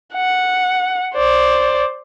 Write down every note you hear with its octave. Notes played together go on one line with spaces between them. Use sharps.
F#5
C5 D5